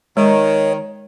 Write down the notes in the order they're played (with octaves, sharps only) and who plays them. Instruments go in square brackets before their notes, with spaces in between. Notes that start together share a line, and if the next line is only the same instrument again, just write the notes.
[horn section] D#3 [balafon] G#3 [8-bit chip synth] C#5